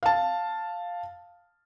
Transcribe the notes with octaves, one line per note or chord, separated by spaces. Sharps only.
F5 A5